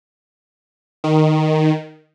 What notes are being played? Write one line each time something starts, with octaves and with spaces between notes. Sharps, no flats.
D#3